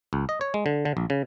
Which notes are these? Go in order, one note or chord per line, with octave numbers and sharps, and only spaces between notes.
C#2
D#5
C#5
G#3
D3
D3
A#1
C#3